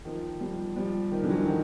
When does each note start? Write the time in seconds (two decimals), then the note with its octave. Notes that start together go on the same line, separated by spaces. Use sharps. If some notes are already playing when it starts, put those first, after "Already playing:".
0.05 D#3 F3
0.40 F3 G3
0.76 F3 G3
1.12 D#3 F3
1.23 D3 E3
1.31 F#3
1.35 D#3 F3
1.47 D#3 F3